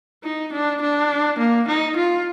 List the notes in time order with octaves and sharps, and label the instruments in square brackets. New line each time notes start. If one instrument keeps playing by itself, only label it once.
[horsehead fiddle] D#4
D4
D4
A#3
D#4
F4